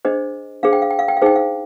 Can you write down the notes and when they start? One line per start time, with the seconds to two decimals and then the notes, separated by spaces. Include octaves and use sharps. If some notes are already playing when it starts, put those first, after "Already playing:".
0.05 D4 G#4 C5 D#5
0.63 D4 G#4 C5 F5
0.73 G5
0.82 F5
0.91 G5
0.99 F5
1.08 G5
1.17 F5
1.22 D#4 G#4 C5 G5
1.35 F5